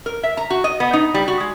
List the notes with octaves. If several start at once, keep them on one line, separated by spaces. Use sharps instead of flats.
A#4
E5
A#5
F#4
D#5
B3
D#4
G3
F#4
G#3